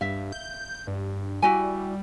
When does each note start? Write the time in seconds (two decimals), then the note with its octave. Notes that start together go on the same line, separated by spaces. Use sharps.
0.01 G2 E5 F5
0.32 G6
0.87 G2
1.42 G3 E4 F#4 G#5